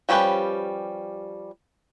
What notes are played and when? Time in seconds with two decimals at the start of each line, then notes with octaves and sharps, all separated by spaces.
0.09 F3 G3 C#4 G4 B4